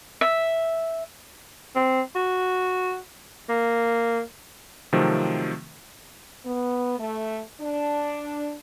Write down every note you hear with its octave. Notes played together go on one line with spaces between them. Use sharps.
E5
C4
F#4
A#3
C3 D#3 F3 F#3 A3 C4
B3
A3
D4